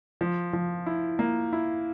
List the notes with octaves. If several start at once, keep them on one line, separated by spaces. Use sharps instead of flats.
F3
F3
E4
A#3
E4